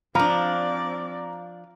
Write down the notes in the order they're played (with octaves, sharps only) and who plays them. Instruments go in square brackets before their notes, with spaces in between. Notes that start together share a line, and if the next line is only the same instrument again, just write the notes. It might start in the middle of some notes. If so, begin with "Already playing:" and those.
[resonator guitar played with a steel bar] F3 D4 [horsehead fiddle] C4 D5 [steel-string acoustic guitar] F5 [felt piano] A#5